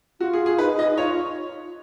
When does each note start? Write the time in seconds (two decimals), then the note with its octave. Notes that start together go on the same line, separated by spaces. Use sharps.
0.20 F4 F#4
0.33 G#4
0.46 G#4
0.58 D#4 B4
0.79 D#5
0.90 D#4
0.98 F4 C#5